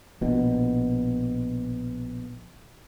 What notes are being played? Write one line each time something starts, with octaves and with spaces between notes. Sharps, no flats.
A#1 B2